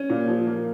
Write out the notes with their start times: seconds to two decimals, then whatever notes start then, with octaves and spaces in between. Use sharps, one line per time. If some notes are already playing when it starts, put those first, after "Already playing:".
Already playing: C#4
0.10 A#2
0.28 F3
0.47 A#3